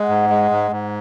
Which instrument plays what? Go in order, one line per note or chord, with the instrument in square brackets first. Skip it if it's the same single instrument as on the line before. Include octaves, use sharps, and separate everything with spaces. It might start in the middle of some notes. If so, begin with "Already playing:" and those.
Already playing: [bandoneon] G#3 [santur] F#5
[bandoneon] G#2
G#3
G#2
G#2